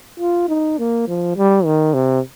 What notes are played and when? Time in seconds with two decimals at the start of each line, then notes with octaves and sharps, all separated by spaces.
0.20 F4
0.48 D#4
0.78 A#3
1.08 F3
1.37 G3
1.65 D#3
1.94 C3